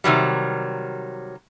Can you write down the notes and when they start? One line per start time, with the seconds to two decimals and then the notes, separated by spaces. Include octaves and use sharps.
0.04 C3 D#3 F#3 G3